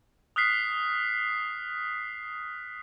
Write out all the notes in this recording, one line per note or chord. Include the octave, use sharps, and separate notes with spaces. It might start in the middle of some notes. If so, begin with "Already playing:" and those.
D#6 F6 F#6 B6 C7